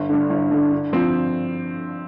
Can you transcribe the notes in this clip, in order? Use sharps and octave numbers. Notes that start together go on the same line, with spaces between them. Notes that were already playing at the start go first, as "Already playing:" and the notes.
Already playing: G1
G2 D3
G1
G2 D3
D3
F3 C4